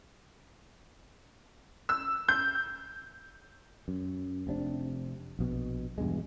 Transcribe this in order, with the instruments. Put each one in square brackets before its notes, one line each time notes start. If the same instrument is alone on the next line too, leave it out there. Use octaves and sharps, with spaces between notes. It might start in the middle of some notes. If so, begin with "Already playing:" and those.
[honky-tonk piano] E6
G6
[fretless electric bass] F#2
F1 C3 D4
A#1 B2
E2 G2 B2 G#3